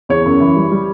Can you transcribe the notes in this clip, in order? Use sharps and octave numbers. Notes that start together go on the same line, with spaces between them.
E2 C#5
F#2
E3
G3
G3